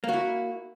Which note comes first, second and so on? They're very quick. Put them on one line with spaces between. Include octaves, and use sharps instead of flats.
A#3 F#4 E4